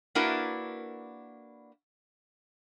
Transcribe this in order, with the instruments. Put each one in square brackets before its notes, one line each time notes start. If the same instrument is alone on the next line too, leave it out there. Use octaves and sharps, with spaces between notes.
[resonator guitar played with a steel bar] A#3 D4 E4 F#4 A#4 B4